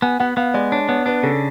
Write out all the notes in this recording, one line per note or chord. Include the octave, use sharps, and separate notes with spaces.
B3 G#5
B3 F#5
B3 F5
G#3 D5
D4 C#5
B3 C#5
D4 B4
C#3 A4